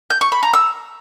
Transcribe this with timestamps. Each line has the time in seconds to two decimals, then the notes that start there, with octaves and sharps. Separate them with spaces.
0.10 G6
0.21 C#6
0.32 B5
0.43 A#5
0.53 E6